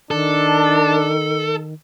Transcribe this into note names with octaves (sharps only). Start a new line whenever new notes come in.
D#3 D4 A4